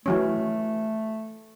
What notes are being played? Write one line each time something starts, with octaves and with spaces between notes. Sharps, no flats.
E3 F#3 A3 C#4